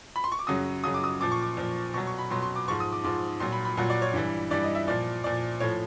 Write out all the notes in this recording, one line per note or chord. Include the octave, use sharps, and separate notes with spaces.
B5
C6
C#6
D6
F#2 C#3 F#3 D#6
F#2 C#3 F#3 D#6
D6
D#6
A#2 F3 D6
C#6
D6
A#2 F3
B2 F#3 C#6
C#6
B5
B2 F#3 C6
C6
D6
G#2 F3 C#6
D#6
D6
G#2 F3 D6
A#2 F#3 C6
B5
B5
A#2 F#3 F#5
D5
C#5
G2 E3 G3
G2 E3 G3 D5
D#5
E5
A#2 F3 D5
A#2 F3 D5
A2 F3 C#5